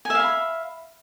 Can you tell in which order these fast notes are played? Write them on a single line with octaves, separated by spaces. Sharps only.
G#5 E5 F5 B5